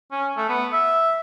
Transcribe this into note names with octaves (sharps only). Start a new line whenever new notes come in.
C#4
A3
B3
E5